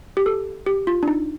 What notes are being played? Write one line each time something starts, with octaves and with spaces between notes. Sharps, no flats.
G4
A4
G4
F4
D4
D#4